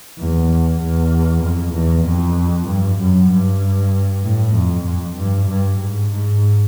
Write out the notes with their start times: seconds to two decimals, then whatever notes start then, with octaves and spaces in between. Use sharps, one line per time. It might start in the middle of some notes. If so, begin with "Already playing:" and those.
0.19 E2
0.81 E2
1.43 F2
1.74 E2
2.05 F2
2.68 G2
2.99 F#2
3.30 G2
4.23 A2
4.54 F2
4.85 F2
5.16 G2
5.47 G2
5.78 G#2
6.10 G#2